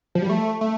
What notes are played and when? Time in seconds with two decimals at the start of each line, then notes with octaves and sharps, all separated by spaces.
0.15 F3
0.22 G3
0.29 A3
0.61 A3